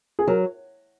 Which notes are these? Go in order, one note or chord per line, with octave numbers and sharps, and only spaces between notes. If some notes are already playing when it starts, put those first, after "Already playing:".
G#4
F#3 A#4